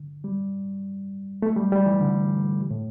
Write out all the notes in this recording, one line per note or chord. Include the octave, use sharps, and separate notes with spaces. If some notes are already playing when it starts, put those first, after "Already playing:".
Already playing: D3
G3
A3
G3
G3
E3
D3
A2